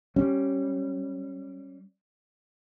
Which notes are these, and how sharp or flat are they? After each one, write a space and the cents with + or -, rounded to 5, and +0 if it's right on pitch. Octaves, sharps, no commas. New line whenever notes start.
G3 -15 C#4 -15